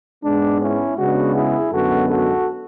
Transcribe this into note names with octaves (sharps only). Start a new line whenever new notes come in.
G#2 G#3 B3 D4
C#4 E4
C#3 G#3 B3 D4 F#4
E4 G#4
F#2 D3 G#3 B3 F#4 A4
F#4 A4